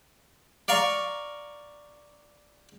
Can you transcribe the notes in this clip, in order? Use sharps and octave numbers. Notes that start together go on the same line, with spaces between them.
D5 F5 A#5 C#6